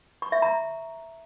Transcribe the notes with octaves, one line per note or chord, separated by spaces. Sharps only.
C#6
E5
A#5